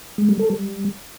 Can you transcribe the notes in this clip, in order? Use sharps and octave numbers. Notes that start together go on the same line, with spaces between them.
G#3
G3
A4
G3